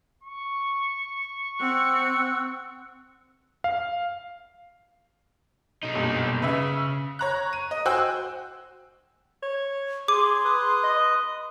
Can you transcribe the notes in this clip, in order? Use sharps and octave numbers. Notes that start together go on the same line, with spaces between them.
C#6
C4 F#5 E6 F#6
F5
B2 D#4
F#1 G2 A#2
C#3 B4 E5
C#5 A#5 F#6
D#7
D#5
F#4 C5 G5 G#5 E6 F#6
C#5
G#4 C6 D6
B4 D#6
D#5